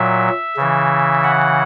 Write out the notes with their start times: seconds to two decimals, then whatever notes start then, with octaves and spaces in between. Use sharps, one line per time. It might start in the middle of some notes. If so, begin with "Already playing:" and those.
Already playing: A#2 F#3 E5
0.56 C#3 E3
1.24 F#5